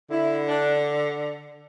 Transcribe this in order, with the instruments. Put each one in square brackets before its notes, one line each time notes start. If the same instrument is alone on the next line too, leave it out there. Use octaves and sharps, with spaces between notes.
[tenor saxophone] D3 [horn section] E4
[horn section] D4